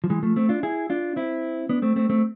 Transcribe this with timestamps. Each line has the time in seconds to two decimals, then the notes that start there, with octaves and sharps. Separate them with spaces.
0.04 F3
0.10 E3 G#3
0.23 F3 A3
0.36 A3 C4
0.49 D4 F4
0.63 E4 G#4
0.90 D4 F4
1.16 C4 E4
1.69 B3 D4
1.82 A3 C4
1.96 A3 C4
2.09 A3 C4